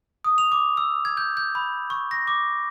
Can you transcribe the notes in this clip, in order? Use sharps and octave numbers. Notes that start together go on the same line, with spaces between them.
D#6
F7
D6
E6
G#6
G6
G6
B5
C#6
A#6
D6